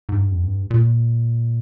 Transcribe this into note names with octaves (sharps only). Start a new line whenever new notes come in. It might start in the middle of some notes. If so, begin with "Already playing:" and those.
G#2
G2
F2
G2
A#2